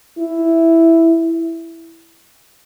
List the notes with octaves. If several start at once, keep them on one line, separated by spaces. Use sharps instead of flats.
E4